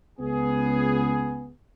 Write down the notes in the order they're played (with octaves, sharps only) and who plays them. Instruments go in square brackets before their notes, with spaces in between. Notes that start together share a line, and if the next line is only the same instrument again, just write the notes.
[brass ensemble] C#2 B3 G#4